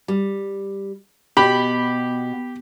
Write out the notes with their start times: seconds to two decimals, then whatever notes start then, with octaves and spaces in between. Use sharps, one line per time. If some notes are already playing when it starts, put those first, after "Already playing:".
0.08 G3
1.37 B2 G4 B5